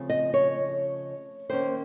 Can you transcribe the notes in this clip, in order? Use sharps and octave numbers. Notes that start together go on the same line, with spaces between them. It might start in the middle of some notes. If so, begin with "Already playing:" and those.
Already playing: C#3 F3 A3 C4
D#5
C#5
D#3 A#3 C#4 C5